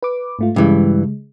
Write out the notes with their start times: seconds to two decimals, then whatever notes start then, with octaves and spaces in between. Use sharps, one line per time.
0.03 B4 D6
0.39 G#2 A3 F4
0.56 G2 C#3 E3 G#3